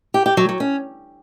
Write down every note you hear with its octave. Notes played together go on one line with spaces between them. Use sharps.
G4
G4
F#3
F#3
C#4